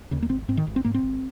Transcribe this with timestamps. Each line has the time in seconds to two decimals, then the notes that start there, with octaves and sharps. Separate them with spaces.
0.11 D#2 C#3
0.22 A#3
0.29 G#1 C4
0.48 G#2 C4
0.57 D#3
0.67 G#1
0.76 C4
0.84 G#2 A#3
0.94 C4
1.03 G#1